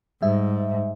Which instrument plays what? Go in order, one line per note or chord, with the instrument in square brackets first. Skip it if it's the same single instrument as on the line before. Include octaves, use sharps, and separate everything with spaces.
[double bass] G#2 [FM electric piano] G3 G#3 E5